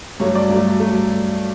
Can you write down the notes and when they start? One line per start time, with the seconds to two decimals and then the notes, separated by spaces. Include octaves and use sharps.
0.20 G2 F#3 A3 C#5
0.35 D5
0.49 G2 F#3 A3
0.80 F#3 A3